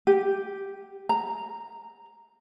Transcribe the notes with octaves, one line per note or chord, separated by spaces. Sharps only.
G4
A#5